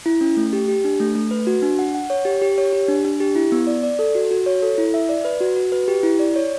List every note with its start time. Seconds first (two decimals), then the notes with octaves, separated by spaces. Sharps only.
0.06 E4
0.21 C#4
0.37 A3
0.53 G4
0.68 G4
0.84 D4
1.00 A3
1.15 A3
1.31 B4
1.47 F#4
1.62 D4
1.79 F#5
1.95 F#5
2.10 C#5
2.25 G4
2.42 G4
2.58 C#5
2.73 G4
2.88 D4
3.05 D4
3.20 G4
3.35 E4
3.52 B3
3.67 D5
3.83 D5
3.99 A4
4.15 F#4
4.31 F#4
4.46 C#5
4.62 A4
4.78 E4
4.94 E5
5.09 D5
5.25 B4
5.41 F#4
5.56 F#4
5.72 B4
5.88 G4
6.03 E4
6.19 D5
6.36 C#5